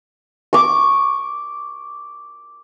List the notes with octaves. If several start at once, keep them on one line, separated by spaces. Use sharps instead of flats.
C#6 D6